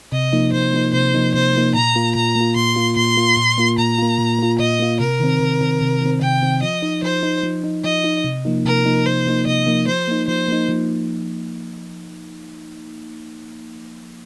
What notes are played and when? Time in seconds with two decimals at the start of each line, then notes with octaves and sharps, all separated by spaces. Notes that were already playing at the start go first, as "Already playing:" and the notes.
0.12 C3 D#5
0.33 F3 A#3 D#4
0.53 C3 C5
0.73 F3 A#3 D#4
0.93 C3 C5
1.14 F3 A#3 D#4
1.34 C3 C5
1.54 F3 A#3 D#4
1.74 A#2 A#5
1.96 A#3 F4
2.15 A#2 A#5
2.36 A#3
2.41 F4
2.56 A#2 C6
2.76 A#3 F4
2.96 A#2 C6
3.17 A#3 F4
3.37 A#2
3.58 A#3 F4
3.78 A#2 A#5
3.98 A#3 F4
4.18 A#2
4.39 A#3 F4
4.59 A#2 D#5
4.79 A#3 F4
5.00 C3 A#4
5.20 D#3 C4
5.40 C3
5.61 D#3 C4
5.81 C3
6.01 D#3 C4
6.21 C3 G5
6.42 D#3 C4
6.62 F3 D#5
6.82 D#4
7.03 F3 C5
7.23 D#4
7.43 F3
7.64 D#4
7.84 F3 D#5
8.04 D#4
8.24 C3
8.45 F3 A#3 D#4
8.65 C3 A#4
8.85 F3 A#3 D#4
9.06 C3 C5
9.26 F3 A#3 D#4
9.46 C3 D#5
9.67 F3 A#3 D#4
9.88 F3 C5
10.08 A#3 D#4
10.28 F3 C5
10.48 A#3 D#4
10.69 F3